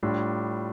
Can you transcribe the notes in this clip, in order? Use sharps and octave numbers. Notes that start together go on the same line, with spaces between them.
A2 G3 D4 F4